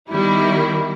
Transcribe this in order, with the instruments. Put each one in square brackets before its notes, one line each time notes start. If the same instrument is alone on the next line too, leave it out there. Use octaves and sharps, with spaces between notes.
[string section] D#3 G3 B3 E4